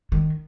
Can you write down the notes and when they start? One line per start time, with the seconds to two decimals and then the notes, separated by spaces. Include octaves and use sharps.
0.12 D#3